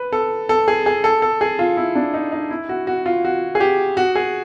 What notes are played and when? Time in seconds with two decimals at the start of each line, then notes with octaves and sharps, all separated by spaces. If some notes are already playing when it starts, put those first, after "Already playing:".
Already playing: B4
0.12 A4
0.49 A4
0.68 G#4
0.86 G#4
1.04 A4
1.22 A4
1.41 G#4
1.59 F4
1.77 E4
1.95 D4
2.14 D#4
2.32 D#4
2.51 E4
2.69 F#4
2.87 F#4
3.06 F4
3.25 F#4
3.55 G#4
3.60 G4
3.97 F#4
4.15 G#4